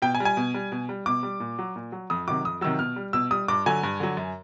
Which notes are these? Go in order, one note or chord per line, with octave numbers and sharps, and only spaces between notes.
B2 G5
G#5
G3
G#5
B2
G3
B2
G3
B2 D6
G3
A#2
F#3
A#2
F#3
F2 D#6
C3 D#3 F#3 D6
F2 D#6
C3 D#3 F#3 E6
B2 F6
G3
B2 E6
G3 D#6
G2 D6
D3 F#3 G#5
G2
D3 F#3
F#2